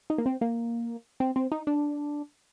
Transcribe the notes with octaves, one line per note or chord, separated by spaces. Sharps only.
D#4
A#3
C4
A#3
C4
C4
D#4
D4